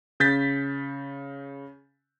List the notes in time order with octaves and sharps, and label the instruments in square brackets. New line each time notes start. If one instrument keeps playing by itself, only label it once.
[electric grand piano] C#3 G6 A6 B6